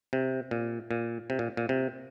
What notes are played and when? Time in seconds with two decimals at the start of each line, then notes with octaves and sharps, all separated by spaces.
0.13 C3
0.51 A#2
0.91 A#2
1.30 C3
1.39 A#2
1.57 A#2
1.69 C3